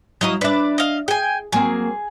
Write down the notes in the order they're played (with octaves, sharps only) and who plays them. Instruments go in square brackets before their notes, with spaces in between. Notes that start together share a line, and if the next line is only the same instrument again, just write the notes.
[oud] F#3 E4 [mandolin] D#5 F5 D#6
[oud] D4 E5 [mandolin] B4 D5
[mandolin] D#5 F5
[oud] G#4 [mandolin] G5 G#5
[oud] F#3 A#3 C4 [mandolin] G#4